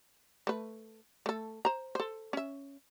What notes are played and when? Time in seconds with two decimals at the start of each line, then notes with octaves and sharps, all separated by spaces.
0.47 A3 B4
1.26 A3 A4
1.65 C5 A#5
1.95 A4 C5
2.33 C#4 E5